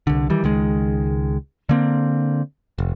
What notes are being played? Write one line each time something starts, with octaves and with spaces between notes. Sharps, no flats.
C2 D3
D#3 E3 G3
C#2 D#3 G#3
D3 A#3 C4
F1